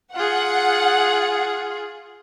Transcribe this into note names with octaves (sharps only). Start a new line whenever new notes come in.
F4 G#4 F#5